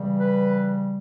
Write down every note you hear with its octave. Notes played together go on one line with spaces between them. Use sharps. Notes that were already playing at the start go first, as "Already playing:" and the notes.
Already playing: C#3 E3 G3
B4